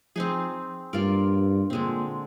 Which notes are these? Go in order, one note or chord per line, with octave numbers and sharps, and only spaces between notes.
F3 C4 D#4 G#4
G2 A#3 F4 A#4 D5
A#2 D3 G#3 C4